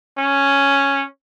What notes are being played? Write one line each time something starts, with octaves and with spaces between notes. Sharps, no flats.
C#4